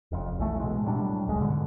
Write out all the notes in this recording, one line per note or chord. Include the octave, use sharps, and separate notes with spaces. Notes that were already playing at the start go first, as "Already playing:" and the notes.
F1 F2
B1 E3 A3
B2 G#3
A2 F#3 G3 D4
E1 C#2 G#3
G#2 B2 D3